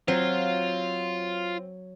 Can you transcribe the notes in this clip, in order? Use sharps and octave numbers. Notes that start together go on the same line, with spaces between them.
F#3 C4 F4